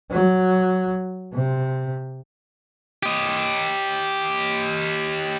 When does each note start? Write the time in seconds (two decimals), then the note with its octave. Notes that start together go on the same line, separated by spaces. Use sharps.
0.11 F#3
1.34 C3
3.03 G4 D#5